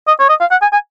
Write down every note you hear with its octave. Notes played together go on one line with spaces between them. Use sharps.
D#5
C#5
D#5
F5
F#5
G#5
G#5